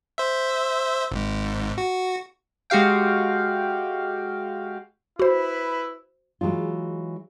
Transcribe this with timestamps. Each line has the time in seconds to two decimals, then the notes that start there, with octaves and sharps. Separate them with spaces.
0.18 C5 E5
1.11 G#1 G#2
1.78 F#4
2.70 G#3 F#4 G4 F5 G5
5.19 E4 F#4 B4 C5 B5
6.41 E3 F#3 G#3 F4